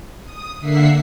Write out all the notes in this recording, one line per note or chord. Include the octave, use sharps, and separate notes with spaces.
D#6
D3 A#3 E5 F#5 B6 C7